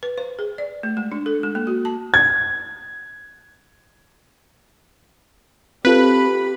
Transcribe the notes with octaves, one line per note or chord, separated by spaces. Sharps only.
B4
C5
G#4
D5
A3
G#3
D4
A4
G#3
A#3
F#4
A5
G#6
C4 F4 G4 A4 B4 B5